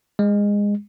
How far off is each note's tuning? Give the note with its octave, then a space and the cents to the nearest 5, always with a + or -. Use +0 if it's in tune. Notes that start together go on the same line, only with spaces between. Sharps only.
G#3 -20